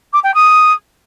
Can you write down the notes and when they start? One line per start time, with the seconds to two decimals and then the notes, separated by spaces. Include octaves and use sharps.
0.13 D6
0.23 G5
0.34 D#6